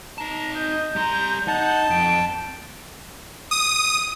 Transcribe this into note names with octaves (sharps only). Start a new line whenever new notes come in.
D#4 A5 A#5
D#5 G6
G3 A#5 C6
D#4 F#5 A5
F2 G5 D7
D#6